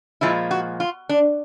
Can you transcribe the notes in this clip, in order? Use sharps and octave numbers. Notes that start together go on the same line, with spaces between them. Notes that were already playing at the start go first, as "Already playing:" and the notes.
A#2 F3 G#3 E4
F#4
F4
D4